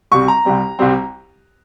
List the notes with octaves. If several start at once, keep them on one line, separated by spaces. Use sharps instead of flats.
C2 C3 G3 C4 C#6
A#5
C2 C3 G3 C4
C2 C3 G3 C4